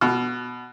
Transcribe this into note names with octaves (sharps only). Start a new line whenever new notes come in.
B2